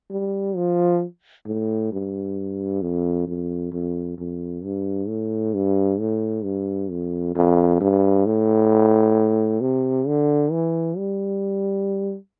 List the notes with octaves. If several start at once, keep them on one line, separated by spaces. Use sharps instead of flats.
G3
F3
A2
G2
F2
F2
F2
F2
G2
A2
G2
A2
G2
F2
F2
G2
A2
C3
D3
E3
G3